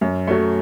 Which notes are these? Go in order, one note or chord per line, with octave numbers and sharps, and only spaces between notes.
F#2
F#3 A3